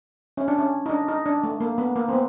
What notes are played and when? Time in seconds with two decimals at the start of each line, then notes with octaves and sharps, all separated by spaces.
0.37 C#4
0.48 D4
0.58 C#4
0.86 D#4
0.90 D4
1.08 D#4
1.26 D4
1.44 A3
1.60 A#3
1.78 B3
1.96 A#3
2.09 C4
2.13 B3